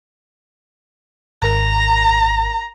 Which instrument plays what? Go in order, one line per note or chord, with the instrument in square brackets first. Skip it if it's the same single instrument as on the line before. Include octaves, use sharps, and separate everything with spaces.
[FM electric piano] G#1 A#4 [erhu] A#5